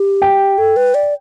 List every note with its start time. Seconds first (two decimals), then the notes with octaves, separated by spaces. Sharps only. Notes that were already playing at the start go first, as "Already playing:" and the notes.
Already playing: G4
0.22 G5
0.58 A4
0.76 B4
0.94 D5